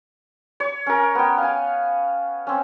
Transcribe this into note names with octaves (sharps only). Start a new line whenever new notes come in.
C#5
C#4 A#4
B3 G5
F5 G#5
C4 C#4